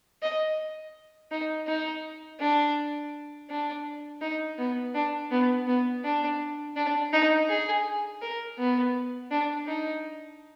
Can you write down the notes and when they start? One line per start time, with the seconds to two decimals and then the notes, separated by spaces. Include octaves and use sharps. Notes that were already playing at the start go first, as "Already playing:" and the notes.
0.22 D#5
1.31 D#4
1.67 D#4
2.40 D4
3.50 D4
4.21 D#4
4.58 B3
4.95 D4
5.31 B3
5.67 B3
6.03 D4
6.76 D4
7.13 D#4
7.49 G#4
8.22 A#4
8.57 B3
9.31 D4
9.67 D#4